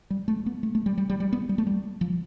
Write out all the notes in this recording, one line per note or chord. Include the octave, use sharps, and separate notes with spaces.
G3
A3
B3
A3
A3
G3
G3
G3
G3
B3
G3
A3
G3
F3